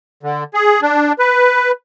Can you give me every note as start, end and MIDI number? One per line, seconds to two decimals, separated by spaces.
0.23 0.44 50
0.54 0.81 68
0.82 1.12 62
1.19 1.71 71